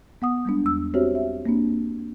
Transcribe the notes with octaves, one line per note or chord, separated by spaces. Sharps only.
B3 F#5 D#6
G3 G#3 B3 D4
E2 E6
C4 F#4 G4 C5 C#5 E5
E5
A#3 C4 D4